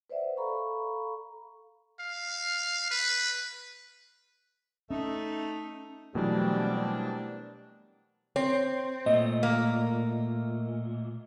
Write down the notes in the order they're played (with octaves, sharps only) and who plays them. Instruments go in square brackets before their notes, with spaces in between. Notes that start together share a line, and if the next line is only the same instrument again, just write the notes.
[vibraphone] B4 C5 D5 E5 F#5
A4 F5 A#5 B5 C#6
[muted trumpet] F5
B4
[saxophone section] A3 D#4 [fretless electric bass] C#4
[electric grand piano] B2 E3 F#3 [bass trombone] G3 [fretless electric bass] A3 [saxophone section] A#3 C4 D4
[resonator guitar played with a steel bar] C4 [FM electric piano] C#5
[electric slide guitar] A#2 A3 [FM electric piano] D#5
[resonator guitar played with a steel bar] A#3